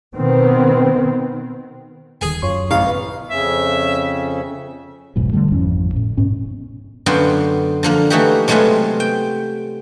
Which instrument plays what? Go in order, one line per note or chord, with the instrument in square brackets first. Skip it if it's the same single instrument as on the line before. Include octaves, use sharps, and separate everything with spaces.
[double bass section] B2 D#3 B3 C4
[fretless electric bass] D#1 D#3 [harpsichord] G#4 G#5
[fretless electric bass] F#2 [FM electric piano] F4 C#5 C6
[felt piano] A1 [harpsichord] F5 [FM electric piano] A#5 C#6
[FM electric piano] B3 [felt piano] B4
[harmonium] F2 C#3 C#4 [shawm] E5
[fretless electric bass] F1 B1 G#2 B2
D3 F3 G3 A3
G#1 F2 E3 C#4
A2
A1 G#2 B2 C#4
[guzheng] F#2 D3 B3 F4 G5 C6
D3 F3 A#3
E3 A3 A#3 D#4 F#4 G4
C3 F#3 G#3 A3 B3 F4
G5